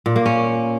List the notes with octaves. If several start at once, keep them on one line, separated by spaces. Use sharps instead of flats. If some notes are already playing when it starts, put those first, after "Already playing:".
A#2
A#3
C#4